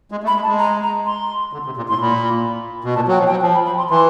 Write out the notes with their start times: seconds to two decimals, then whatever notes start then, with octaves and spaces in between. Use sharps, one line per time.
0.11 G#3
0.23 A3
0.27 B5
0.35 G#3
0.43 A5
0.48 G#3
0.59 A#5
0.83 A#5
1.06 C6
1.53 D3
1.66 C3
1.77 A#2
1.89 A2 C6
2.01 A#2 B5
2.84 B2
2.95 A#2 A5
3.08 F#3 G5
3.19 F3
3.26 G5
3.31 F#3
3.42 F3 A5
3.54 B5
3.66 B5
3.78 C6
3.90 E3 C6